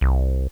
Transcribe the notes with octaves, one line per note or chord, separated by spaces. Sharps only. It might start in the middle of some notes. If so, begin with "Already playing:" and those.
C2